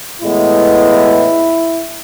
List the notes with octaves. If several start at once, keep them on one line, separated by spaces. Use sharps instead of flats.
A2 E3 G#3 B3 E4